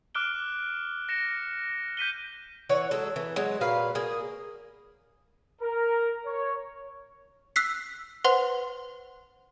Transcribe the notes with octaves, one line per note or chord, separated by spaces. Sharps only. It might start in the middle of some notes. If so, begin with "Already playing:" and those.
D6 F6 F#6 D7 G7
A#6 C#7 E7
G6 B6 D#7 G7
E3 C#5 F#5
F#3 G#3 A4
E3
F#3 G#3
A#2 F#3 B4 F5
A#3 G#4
A#4
C#5
E6 F#6 B6 C7
B4 C5 F#5 C6